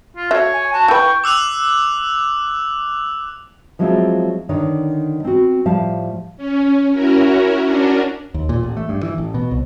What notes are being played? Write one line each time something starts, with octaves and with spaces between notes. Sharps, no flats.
F4
A3 F#4 C#5 E5
G#5
F#4 A5
E4 B4 G5 C#6
D6 E6 F#6 F7
F3 F#3 G#3 C4 E4 F4
D3 D#3 D4 C#5
C4 F#4
A2 F3 G3 F5 A5
C#4
C#4 E4 F#4 A#4
C#4 D4 F#4 A#4
D#2
A#2
A1
A3
G2
E3
A1
B2
C2